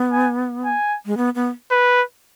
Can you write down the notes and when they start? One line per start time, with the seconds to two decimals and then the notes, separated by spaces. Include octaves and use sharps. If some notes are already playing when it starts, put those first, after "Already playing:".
Already playing: B3
0.12 G#5
0.65 G#5
1.06 G#3
1.17 B3
1.35 B3
1.71 B4